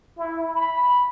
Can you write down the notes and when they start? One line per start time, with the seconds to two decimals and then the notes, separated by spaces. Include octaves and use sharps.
0.18 E4
0.54 B5